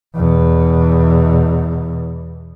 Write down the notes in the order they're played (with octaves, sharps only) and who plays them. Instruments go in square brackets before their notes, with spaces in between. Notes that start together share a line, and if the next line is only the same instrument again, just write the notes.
[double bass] E2 B2